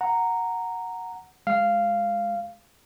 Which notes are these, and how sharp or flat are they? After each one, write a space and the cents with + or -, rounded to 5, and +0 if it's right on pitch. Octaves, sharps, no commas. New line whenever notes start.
F#5 -5 A#5 -5
G#3 +0 F5 -10